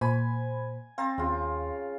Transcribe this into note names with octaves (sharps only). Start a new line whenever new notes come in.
A#2 C5 G#5 B5
C4 F5 A#5 A6
D#2 C#3 F4